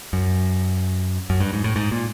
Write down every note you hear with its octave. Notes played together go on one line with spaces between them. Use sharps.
F#2
F#2
G2
G#2
A2
G#2
A#2